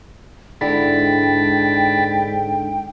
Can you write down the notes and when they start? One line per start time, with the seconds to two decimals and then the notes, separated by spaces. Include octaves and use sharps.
0.61 G#2 D3 D4 E4 G5 A5 B5